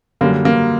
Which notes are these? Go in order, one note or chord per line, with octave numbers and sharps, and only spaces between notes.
F#2 D3 G3 A#3
A#3